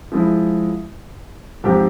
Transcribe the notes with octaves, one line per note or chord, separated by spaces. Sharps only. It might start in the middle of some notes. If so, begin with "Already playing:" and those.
F3 G#3 E4
G#2 F3 C4 G4